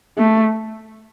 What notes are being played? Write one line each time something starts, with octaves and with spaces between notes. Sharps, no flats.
A3